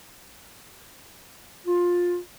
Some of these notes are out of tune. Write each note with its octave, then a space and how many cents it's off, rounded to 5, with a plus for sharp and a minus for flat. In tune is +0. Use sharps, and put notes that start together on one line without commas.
F4 +15